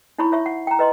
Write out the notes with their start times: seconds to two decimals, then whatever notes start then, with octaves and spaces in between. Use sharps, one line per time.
0.18 D#4 E4 C#5 B5 C#6
0.32 C#5 E5 C#6
0.46 F#5
0.67 G5 A#5
0.79 B4 D#5 C6